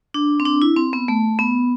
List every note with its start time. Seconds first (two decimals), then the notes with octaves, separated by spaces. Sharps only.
0.14 D4
0.40 C4
0.45 D4
0.62 E4
0.76 C4
0.93 B3
1.08 A3
1.39 B3